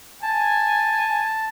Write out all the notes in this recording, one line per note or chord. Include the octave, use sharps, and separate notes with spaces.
G#5 A5